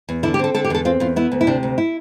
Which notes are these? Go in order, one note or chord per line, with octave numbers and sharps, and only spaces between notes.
E2
D3 E4
G4
C4 A4
D3 A4
G4
E2 A4
C4 F4
E2 F4
B3 E4
D2
E4
C3 D4
D2
E4